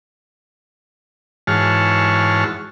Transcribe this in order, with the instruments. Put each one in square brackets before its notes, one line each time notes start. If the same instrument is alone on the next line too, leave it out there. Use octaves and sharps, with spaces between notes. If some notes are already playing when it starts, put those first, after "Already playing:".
[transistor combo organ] G#2 E3 F#4 C#5 A5 F6